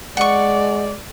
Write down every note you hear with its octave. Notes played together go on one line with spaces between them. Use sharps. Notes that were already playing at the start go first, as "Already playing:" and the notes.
G#3 D5 F#5 C#6